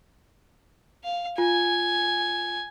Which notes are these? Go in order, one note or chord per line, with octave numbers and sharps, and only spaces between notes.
F5
F4 G#5